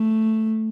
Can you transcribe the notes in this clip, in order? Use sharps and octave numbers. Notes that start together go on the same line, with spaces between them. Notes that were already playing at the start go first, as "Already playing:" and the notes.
Already playing: A3